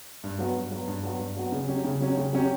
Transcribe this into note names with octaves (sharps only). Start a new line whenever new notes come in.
G2
F#3 B3 F#4
G2
F#3 B3 F#4
G2
F#3 B3 F#4
G2
F#3 B3 F#4
C#3
F#3 C#4 G4
C#3
F#3 C#4 G4
C#3
F#3 C#4 G4